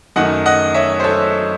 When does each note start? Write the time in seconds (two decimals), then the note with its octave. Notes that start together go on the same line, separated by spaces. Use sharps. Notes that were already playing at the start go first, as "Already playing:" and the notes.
0.16 F#2 D#3 A3 D#5 F#5
0.46 D#5 F#5
0.74 C#5 E5
1.00 C5
1.04 A4 C#5